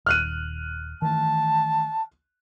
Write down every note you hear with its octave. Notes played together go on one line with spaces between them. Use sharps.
D#1 D#2 F6 F#6 D#7
D#3 E3 A3 A5